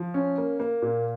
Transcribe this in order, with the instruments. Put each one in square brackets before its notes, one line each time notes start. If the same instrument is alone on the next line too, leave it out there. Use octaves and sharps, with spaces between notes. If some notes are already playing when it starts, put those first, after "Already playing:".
Already playing: [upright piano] F3
C#4
A#3
A#3
A#2